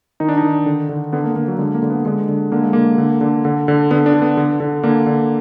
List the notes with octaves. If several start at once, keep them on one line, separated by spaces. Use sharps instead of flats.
D#3 D#4
D4
D#4
D#3
D3
D3
D3 B3
A#3
D3 A#3
F#3
D3 G#3
A#3
D3
B3
D3 G#3
D3
D3 A#3
G#3
D3 A#3
D3
D3
D3
D3
D3 B3
D4
D3
B3
D3
D3
D3 A#3
D3